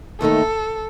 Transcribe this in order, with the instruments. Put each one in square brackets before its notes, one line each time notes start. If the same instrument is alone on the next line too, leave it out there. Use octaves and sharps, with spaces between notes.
[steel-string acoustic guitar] D#2 D#3 A3 D#4 [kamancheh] A4